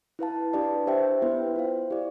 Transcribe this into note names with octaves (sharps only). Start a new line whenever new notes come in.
E4 B4 F5 A5
D4 G4 B4 D5 A5
G4 C5 E5 G5
B3 E4 B4 E5 G5
F4 C5 F5
E4 G4 D5